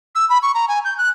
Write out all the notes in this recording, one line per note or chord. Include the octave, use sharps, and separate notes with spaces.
E6
B5
C#6
A#5
G#5
G6
F#6